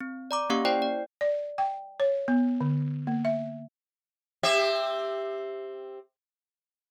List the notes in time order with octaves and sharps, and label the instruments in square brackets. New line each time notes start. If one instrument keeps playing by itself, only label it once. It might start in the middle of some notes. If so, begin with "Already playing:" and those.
[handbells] C4
D5 A#5 D6
A#3 C#4 G4 F5 C#6
E4 C5 D5 G5 C7
D5
[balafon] D5
G5
C#5
B3
D3
A#3
E5
[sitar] C4 G4 E5